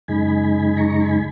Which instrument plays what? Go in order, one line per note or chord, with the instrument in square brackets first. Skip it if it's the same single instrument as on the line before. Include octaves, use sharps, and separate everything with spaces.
[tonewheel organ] F#2 C#3 G#3 D#4 G#5 B5
A#5 C#6
G#5 B5